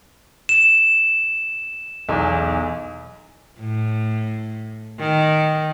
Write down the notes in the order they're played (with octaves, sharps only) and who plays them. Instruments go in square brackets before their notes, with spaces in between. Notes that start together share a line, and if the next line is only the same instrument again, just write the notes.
[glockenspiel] E7
[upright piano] B1 E2
[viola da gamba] A2
D#3